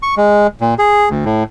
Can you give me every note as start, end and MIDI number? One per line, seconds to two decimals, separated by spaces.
0.03 0.15 85
0.17 0.47 56
0.61 0.74 46
0.79 1.09 68
1.10 1.25 38
1.25 1.44 45